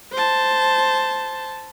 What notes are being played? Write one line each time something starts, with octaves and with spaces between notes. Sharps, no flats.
C5 A5